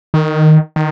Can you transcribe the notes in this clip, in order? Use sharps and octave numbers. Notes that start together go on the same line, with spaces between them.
D#3
D#3